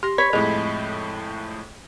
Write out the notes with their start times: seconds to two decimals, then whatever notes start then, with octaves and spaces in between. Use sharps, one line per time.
0.03 G4 C6 A#6
0.18 C#5 B5 G#6 B6
0.33 F2 A2 G#3 G#4 D#5